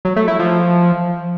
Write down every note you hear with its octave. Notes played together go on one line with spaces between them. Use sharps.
F#3
A3
E4
F3